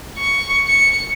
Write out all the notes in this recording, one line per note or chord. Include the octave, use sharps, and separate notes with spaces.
C#6
C#7